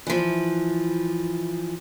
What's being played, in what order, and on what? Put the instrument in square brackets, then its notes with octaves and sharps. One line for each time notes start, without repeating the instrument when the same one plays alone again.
[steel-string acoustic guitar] E3 F3